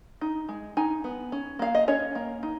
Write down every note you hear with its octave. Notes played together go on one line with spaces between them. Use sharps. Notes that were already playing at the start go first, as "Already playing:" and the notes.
D#4
G#3
D#4 G#5
B3
C#4
A#3 F5
D#5
C#4 C#5
A#3
D#4